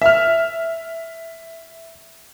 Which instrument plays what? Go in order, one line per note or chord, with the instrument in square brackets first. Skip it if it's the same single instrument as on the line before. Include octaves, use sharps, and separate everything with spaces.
[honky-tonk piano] E5 F6